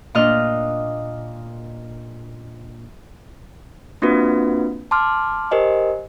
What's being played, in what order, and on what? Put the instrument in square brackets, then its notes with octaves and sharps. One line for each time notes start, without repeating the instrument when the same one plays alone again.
[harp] A#2 D4 D#5 F6
[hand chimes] A#3 C4 D4 F4 F#4 B4
A5 C6 D6 F6
G4 A#4 C5 D#5 G#5